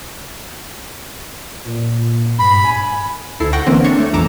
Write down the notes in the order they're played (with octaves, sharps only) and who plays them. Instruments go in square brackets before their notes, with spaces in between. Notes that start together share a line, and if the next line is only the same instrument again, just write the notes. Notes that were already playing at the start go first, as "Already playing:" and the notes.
[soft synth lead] A#2
[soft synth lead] G2 [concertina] B5
[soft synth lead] G#5
[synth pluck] D2 E4 A4 C7
F#5 G5 C#6 A#6 D7
D3 E3 A#3 C4 C#4
D4 C#5 G#6 C#7
A3
B1 F2 E3 A#5 D6 E7